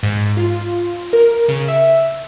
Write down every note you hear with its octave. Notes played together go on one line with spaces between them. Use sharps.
G#2
F4
A#4
C#3
E5